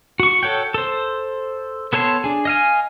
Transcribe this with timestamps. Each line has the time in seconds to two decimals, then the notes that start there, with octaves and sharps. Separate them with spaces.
0.20 F#4 C#6
0.43 A4 C#5 F#5 G5
0.74 A4 C5
1.93 B3 A4 C#5 A5 C6
2.24 D4 G#4
2.45 D#5 F5 G#5